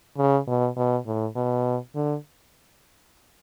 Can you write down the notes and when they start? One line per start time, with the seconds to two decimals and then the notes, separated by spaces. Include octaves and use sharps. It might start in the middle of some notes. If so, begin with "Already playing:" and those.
0.18 C#3
0.47 B2
0.76 B2
1.06 A2
1.36 B2
1.95 D3